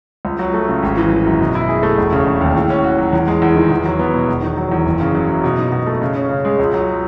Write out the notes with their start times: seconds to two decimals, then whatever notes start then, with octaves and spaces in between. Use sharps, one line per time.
0.25 C#2
0.39 F#3
0.54 A3
0.69 C#3
0.83 G#1
0.97 E3
1.11 G#1
1.25 F#2
1.40 B2
1.55 E4
1.68 G#4
1.83 A3
1.98 E1
2.12 C#3
2.27 E1
2.41 D#2
2.56 A2
2.70 C#4
2.84 F#4
2.98 F#3
3.13 E2
3.28 G#3
3.42 E2
3.56 D#3
3.71 E2
3.85 F#3
3.99 B3
4.14 B2
4.28 E1
4.42 D#3
4.57 F#3
4.71 E2
4.86 F#1
5.01 C#3
5.15 F#3
5.29 F#2
5.44 B2
5.58 D#4
5.72 B2
5.87 A3
6.02 C#3
6.16 C#4
6.29 C#3
6.45 G#3
6.59 C#2
6.73 F#3